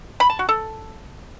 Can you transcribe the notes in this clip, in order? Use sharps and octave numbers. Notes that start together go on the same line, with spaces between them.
B5
A5
F#4
A4